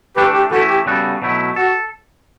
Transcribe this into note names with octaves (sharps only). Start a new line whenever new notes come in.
E3 A3 D4 G4 A4 B4
G4
E3 A3 C#4 E4 F#4 A4
G4
C#3 G3 B3 F#4 A4
B2 F#3 A3 E4
F#4 A4